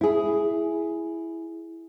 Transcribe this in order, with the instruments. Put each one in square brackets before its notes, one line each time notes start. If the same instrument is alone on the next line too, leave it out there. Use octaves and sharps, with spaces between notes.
[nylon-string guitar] E4 G#4